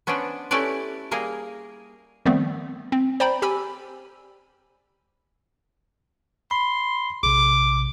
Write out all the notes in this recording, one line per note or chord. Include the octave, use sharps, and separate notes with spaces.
B3 C#4 D4 C5 D5
A3 C#4 E4 G4 B4 D5
G3 A#3 G#4 A#4
D#3 F3 G3 A3 B3 C4
C4
C5 D5 G5 A#5 B5
G4 G#5 B5 E6
B5 C6
A#1 C3 D6